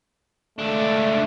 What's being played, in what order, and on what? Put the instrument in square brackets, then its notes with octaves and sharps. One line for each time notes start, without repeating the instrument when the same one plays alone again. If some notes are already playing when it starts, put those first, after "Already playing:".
[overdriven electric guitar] C#2 D4 [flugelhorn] A3